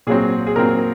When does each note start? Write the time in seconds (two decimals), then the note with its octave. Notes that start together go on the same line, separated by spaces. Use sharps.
0.07 A#2 F#3 C4 G#4
0.47 G#4
0.56 A#2 F#3 C4 A#4